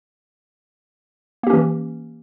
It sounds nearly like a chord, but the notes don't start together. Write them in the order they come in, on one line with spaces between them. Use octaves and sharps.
A#3 G4 C#4 E3